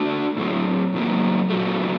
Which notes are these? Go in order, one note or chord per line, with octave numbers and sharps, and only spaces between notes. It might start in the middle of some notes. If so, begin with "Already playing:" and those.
Already playing: A3 D4 F#4
A2 F#3 C4
A2 F#3 A#3
A#2 F#3 A3